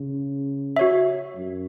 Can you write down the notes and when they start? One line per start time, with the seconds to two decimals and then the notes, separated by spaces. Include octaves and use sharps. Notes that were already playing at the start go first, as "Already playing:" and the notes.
Already playing: C#3
0.76 F#4 C#5 E5
1.35 F#2